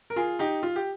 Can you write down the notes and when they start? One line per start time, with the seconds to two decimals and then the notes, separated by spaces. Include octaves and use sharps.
0.10 A#4
0.16 F4 G#4
0.39 D#4 G4
0.63 F4
0.76 G4